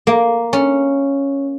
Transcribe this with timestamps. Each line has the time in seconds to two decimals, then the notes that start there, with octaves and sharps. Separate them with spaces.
0.07 A#3
0.53 C#4